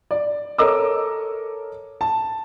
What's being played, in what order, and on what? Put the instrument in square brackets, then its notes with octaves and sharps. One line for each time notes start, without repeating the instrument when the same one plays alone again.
[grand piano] D5
A4 A#4 C#5 D#5 D6 E6
A5